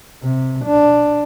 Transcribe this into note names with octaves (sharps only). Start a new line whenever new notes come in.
C3
D4